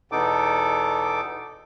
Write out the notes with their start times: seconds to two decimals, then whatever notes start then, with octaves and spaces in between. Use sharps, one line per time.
0.12 E2 B2 B3 D#4 A4 D6